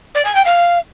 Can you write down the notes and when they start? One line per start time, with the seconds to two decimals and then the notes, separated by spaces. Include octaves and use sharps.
0.15 D5
0.25 G#5
0.35 G5
0.45 F5